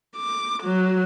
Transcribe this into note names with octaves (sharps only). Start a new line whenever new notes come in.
D6
F#3